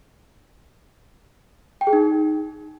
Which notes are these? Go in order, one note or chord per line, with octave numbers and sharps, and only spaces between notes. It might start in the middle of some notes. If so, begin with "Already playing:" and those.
G5
G#4
D#4